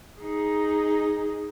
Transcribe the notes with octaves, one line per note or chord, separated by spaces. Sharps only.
D#4 G#4